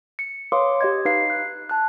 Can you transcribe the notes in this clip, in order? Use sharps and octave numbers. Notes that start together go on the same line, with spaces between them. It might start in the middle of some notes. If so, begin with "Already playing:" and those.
C#7
B4 C#5 F5 C6 D6 D#6
G4 D#5 G#6
D#4 B4 F5 C7
F#6
A5 F#6